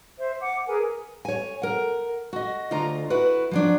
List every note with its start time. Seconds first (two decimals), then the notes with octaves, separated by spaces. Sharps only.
0.18 C5 E5
0.40 F#5 D6
0.67 G#4 A#4 B4 G#5
1.25 C#5 G#5
1.62 A#4 F#5
2.33 F#4 D#5
2.71 D2 F4 D#5 A#5
3.10 E4 F#4 B4
3.51 F3 F#3 D4